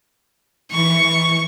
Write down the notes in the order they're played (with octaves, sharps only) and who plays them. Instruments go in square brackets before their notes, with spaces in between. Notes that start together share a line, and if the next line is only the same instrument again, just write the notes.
[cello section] E3 [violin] C#6